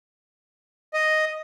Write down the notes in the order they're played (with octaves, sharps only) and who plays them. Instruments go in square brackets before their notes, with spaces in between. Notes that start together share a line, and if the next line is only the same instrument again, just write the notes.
[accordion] D#5